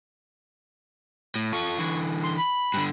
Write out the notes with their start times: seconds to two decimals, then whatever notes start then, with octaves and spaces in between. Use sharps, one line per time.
1.36 A2
1.52 F4 A4 C#6
1.78 D3 E3
2.23 C6
2.37 B5
2.74 G2 D3